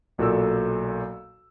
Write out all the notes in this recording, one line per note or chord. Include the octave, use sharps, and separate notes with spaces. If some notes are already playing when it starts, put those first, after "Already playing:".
B1 A#2 F#4 A4 D5 E6